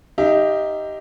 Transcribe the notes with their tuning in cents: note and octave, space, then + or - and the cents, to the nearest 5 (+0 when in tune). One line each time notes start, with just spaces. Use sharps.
D#4 +0 G4 +0 E5 +35